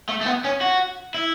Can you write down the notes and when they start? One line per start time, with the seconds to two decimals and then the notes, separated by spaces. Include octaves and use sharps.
0.09 A3
0.21 A3
0.26 B3
0.44 C#4
0.61 F#4
1.14 E4